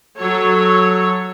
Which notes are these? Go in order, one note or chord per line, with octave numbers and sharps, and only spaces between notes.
F#3 A4 C#5